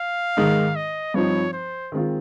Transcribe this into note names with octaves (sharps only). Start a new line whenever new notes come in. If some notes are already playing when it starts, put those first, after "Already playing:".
Already playing: F5
G#2 D#3 G#3 D#4
D#5
G2 F3 C4 D#4 C#5
C5
D#3 G#3 C4 F4